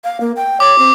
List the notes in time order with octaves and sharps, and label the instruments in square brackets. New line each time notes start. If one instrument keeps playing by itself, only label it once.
[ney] F5
A#3
G5
[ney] C#5 [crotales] D6
[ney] C4